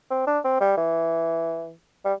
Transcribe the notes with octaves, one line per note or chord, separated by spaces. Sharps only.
C4
D4
C4
G3
E3
G3